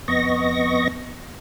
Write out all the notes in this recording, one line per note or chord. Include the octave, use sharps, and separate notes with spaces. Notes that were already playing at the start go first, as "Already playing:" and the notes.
F2 B3 D#5 C#6 A#6